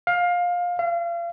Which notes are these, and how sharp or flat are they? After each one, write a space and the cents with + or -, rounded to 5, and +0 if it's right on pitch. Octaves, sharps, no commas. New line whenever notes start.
F5 +20
F5 -35